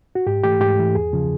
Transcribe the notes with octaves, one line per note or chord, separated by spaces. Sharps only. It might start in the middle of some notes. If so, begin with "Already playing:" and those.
F#4
G#2 G4
E3 A3 G4
G#2 G4
E3 A3
E2 G#4
C#3 F3